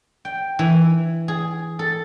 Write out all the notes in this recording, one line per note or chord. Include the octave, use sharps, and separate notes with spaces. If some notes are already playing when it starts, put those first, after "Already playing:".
G5
E3
G#4
A4